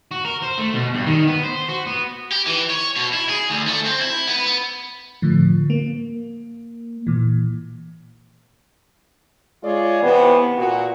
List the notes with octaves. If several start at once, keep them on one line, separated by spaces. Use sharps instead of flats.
F#4
A#4
C5
A3
B2
G2
D#3
B3
C5
F#4
B3
G4
E3
C#5
B2
E4
G#4
D2
A3
C4
E4
B3
B3
A2 D3 F3
A#3
A#2 E3
G#3 F4 G#4 C#5 D5
C3 E3 B3
A#2 F#4